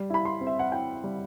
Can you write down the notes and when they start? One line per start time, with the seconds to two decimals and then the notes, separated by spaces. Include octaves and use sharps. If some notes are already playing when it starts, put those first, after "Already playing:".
Already playing: G3
0.10 E4 B5
0.25 C6
0.41 C4
0.47 E5
0.59 F#5
0.72 E4 G5
1.04 G3